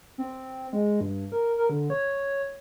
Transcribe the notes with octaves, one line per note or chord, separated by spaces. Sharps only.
C4
G#3
G2
A#4
A#4
D3
C#5